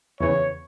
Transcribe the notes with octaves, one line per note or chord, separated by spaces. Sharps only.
E2 C#3 E3 C#5